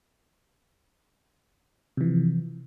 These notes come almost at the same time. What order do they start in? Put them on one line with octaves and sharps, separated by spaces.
C3 E3 F3